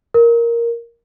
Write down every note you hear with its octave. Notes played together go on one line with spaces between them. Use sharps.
A#4